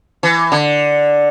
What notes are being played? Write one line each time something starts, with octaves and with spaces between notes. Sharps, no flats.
E3
D3